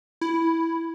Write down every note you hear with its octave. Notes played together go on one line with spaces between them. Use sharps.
E4